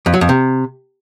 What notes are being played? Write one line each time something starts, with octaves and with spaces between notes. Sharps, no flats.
F2
F#3
F2
C3